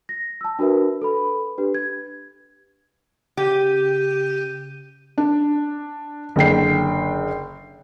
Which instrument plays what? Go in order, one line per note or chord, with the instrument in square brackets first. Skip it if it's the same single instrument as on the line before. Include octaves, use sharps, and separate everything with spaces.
[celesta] A#6
A5 E6
D4 F#4 A#4 B4 E5
A4 B4 B5
D4 G4 B4
G#6
[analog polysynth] C#3 G6 D#7 [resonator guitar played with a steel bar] G4
[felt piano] D4
F#1 D3 G5 C7